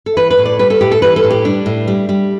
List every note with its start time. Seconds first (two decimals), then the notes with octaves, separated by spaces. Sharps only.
0.06 A4
0.17 E3 B4
0.30 B4
0.38 A2
0.45 D5
0.59 G3 B4
0.70 A4
0.81 A2 G4
0.91 A4
1.02 E3 B4
1.16 A4
1.23 A2
1.30 G4
1.45 G3 D4
1.66 A2
1.88 G3
2.09 G3